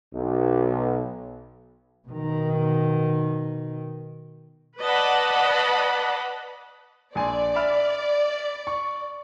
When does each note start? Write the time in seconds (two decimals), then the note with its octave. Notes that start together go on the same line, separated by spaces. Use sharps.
0.14 B1
2.08 B2 D#3
4.81 B4 D5 D#5 F#5 A5 B5
7.15 A#1 D5 G#5 C6
7.55 E5 B5 F6
8.67 C#6